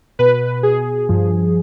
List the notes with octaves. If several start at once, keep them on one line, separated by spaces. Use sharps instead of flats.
B2 B4
G#4
G2 F3